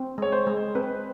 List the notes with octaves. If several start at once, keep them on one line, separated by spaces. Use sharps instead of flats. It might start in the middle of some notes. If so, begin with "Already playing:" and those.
Already playing: C4
G#3 C#5
C5
G#3
C4 B4